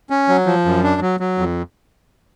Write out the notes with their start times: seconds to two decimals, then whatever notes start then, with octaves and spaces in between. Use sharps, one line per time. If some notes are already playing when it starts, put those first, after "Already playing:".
0.10 C#4
0.28 F#3
0.46 F3
0.65 F#2
0.84 D4
1.01 F#3
1.20 F#3
1.38 F2